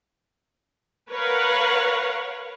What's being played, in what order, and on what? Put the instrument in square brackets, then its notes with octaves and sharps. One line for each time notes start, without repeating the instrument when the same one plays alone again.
[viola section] A#4 B4 C#5 F5 F#5